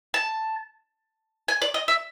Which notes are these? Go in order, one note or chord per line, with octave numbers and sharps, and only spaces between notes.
A5
G#5
D5
D#5
E5